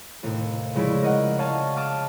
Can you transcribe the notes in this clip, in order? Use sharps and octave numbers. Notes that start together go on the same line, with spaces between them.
D#2 A2 C3
C#3 F3 G#3 E4 C#5 D5
A#4 D#5 F#5
C#5 D#5 F5 A5 F6
A5 D6 D#6 F6